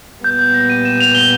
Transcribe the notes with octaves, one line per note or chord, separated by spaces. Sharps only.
A#2 G3 B3 G6
G6
A#6
D#7
E7
F7
G7